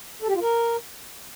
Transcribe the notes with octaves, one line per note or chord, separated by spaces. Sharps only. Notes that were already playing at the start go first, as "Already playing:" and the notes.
A4
G4
F4
A#4